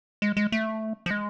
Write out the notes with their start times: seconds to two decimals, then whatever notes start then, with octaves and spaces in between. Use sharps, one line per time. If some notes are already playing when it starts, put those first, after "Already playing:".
0.22 G#3
0.37 G#3
0.52 A3
1.06 F3
1.11 G#3